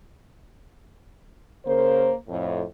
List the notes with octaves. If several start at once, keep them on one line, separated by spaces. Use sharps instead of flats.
C#3 A#3 A#4 C5
F2 A2